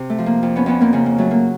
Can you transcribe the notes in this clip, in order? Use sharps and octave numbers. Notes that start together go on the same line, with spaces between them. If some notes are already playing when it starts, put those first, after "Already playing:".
Already playing: C3
A3
F3
A#3
F2
B3 C#4
F2 B3 C#4
A#3 C4
C#3 A#3
A#3
F#3 A3
A#3